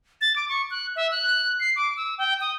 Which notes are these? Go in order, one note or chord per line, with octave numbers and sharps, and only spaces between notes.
A6
D6
C#6
F#6
E5
F#6
C7
D6
E6
G5
D#6